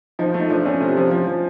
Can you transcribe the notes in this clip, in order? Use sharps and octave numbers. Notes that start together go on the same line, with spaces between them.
F3 D#4
A3
D#4
F3 D4
A3 C#4
C3
F3
F3
F3